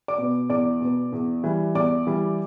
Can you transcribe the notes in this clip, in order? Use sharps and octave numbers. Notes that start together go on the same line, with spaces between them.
D5 D6
B2 B3
E2 D5 D6
B2 B3
E2
E3 G3
E2 D5 D6
E3 G3